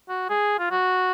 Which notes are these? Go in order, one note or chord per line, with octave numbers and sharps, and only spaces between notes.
F#4
G#4
F4
F#4